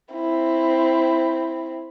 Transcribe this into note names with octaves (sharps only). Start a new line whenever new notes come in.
C4 E4